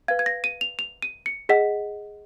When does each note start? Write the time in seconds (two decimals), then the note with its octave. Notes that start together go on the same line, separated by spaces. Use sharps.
0.08 B4 F5 G#6
0.19 G#6
0.26 A#6
0.44 D#7
0.61 F7
0.79 F7
1.02 D#7
1.26 C#7
1.49 G#4 D#5 F#5 B6